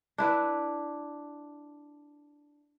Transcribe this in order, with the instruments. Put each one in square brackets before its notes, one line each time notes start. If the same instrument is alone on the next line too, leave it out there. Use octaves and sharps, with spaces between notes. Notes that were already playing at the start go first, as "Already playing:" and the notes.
[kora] D4 E4 B4